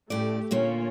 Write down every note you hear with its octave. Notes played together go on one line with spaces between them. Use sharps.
A2 A3 C#4 G4 D5
D2 A#2 A#3 C#4 F4 C#5